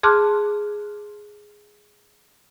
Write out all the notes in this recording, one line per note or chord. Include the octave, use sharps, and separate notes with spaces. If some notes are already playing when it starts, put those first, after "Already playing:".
G#4 A5 C6 D6 F6 F#6